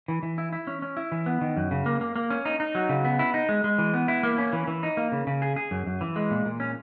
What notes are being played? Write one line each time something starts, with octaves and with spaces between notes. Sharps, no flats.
E3
E3
E4
E4
C#4
C#4
E4
E3
B3
D#3
F#2
C#3
A#3
A#3
A#3
C#4
D#4
D#4
F#3
C#3
B3
E4
D#4
G#3
G#3
E3
B3
E4
A#3
C#4
E3
E3
D#4
A#3
C#3
C#3
G#4
G#4
F#2
F#2
E3
G#3
A#2
A#2
C#4